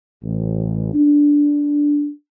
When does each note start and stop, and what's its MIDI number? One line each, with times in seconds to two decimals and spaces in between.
0.24 0.92 33
0.94 2.09 62